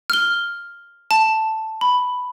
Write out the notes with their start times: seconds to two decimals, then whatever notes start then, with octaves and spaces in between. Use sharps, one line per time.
0.10 F6 G7
1.11 A5
1.81 B5